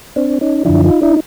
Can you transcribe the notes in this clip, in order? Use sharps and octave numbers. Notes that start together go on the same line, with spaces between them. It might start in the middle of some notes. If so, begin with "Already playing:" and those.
C4 D4
C#4 D#4
F#2 D3 F3 D4 E4
D#4 F4
D4 E4
D#4